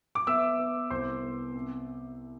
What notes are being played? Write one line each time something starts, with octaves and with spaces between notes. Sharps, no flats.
D6
B3 E5 E6
B3
C2 C5 C6
B3
C4